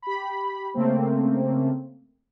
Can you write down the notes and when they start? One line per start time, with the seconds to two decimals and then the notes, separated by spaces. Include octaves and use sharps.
0.02 G4 B5
0.74 C#3 A3 A#3 C4